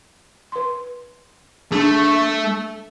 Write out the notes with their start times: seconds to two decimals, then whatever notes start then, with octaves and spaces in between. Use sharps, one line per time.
0.52 B4 C6
1.72 A3 D4 G#4